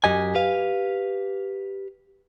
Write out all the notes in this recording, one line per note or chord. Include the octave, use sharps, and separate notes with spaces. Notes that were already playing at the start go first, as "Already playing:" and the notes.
F#2 G4 D#5 G#5
G4 B4 F5